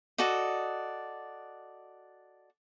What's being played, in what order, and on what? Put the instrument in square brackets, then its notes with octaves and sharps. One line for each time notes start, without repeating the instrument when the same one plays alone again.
[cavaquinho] F#4 A4 D5 D#5